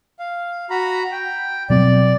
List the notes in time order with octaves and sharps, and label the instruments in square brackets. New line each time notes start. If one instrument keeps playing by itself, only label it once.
[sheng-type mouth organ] F5
F#4 A#5 B5
G5
[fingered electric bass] B2 F#3 C4 [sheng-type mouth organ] D5